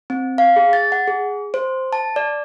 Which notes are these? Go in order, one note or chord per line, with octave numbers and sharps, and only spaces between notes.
C4
F5
G#4
A6
F#5
G#4
C5
A5
D5